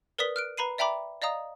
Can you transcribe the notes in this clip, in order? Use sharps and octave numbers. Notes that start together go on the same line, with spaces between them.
A#4 B4 D5 D#6 B6 G7
F6 F#6 D7
B4 A#5 B5 C7 D#7
D5 E5 G5 A#5 B5 D6
D5 D#5 F5 A#5 D#6